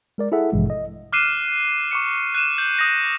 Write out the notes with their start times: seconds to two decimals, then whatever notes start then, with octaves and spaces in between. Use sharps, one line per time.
0.18 G#3 A#4 D5
0.32 E4 G#4 A4 E5 F#5
0.52 A1 G2 B2 E3 F3 G#3
0.70 D#5
1.12 D6 F6 F#6 C7 D#7 E7
1.91 C#6 D6 C#7
2.35 F#6 D#7 E7
2.58 G6 F#7
2.79 D#6 A#6